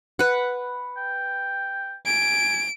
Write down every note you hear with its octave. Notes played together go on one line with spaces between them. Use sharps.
B4 F#5
G5
G#5 D7